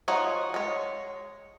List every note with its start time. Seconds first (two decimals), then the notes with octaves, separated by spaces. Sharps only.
0.08 F3 D#4 F#4 G#4 C#5
0.54 G#3 C#5